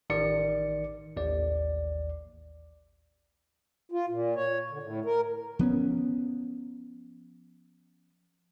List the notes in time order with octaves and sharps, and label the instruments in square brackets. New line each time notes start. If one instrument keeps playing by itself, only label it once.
[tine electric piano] A1 D#3 D5 C#7
A1 D#2 D5
[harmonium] F4
A#2
C#5
D3
A2
A#4
[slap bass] F3 B3 C#4